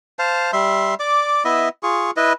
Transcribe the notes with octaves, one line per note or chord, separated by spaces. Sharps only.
C5 F5 A5
G3 E5 C6
D5 D6
B3 E4 D#5 E5
F4 G#4 C#6
E4 B4 D#5